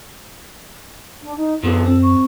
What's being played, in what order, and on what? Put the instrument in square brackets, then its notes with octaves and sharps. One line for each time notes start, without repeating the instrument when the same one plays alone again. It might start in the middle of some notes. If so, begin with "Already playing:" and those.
[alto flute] D4
D#4
[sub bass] F#2 [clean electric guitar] D3 F3 B3 [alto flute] A4
[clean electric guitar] C4
[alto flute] C#6